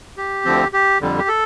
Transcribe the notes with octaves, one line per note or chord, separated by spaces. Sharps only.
G4
D2 D3 F3 C4
G4
F2 D3 G3
G4
A4